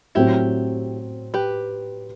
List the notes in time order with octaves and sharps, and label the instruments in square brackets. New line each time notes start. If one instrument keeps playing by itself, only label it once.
[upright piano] A2 F#3 C4 F#4 [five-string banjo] E4 G4
[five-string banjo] G4 B4